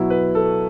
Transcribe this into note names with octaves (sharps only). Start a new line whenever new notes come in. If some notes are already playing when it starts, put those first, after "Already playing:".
Already playing: B2 F#3 B3 E4
B4
A4